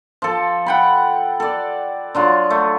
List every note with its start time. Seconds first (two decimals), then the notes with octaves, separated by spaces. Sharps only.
0.22 F3 A4
0.66 F#5 G5 B5
1.40 A4 D5
2.15 D3 F#3 F4
2.51 A3